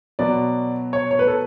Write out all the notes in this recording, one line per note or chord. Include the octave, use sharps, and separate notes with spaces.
B2 F#3 D5
C#5
C#5
B4
A4